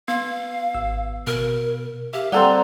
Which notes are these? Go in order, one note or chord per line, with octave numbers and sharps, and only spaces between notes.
B3 F5
G#1 E6
B2 A#4
G4 E5 F5
G3 C4 A4 D5 F#5 A#5